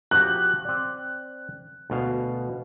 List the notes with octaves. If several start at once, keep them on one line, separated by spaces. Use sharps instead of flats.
F3 F#4 G4 F#6
C4 D5
D2 B2 F5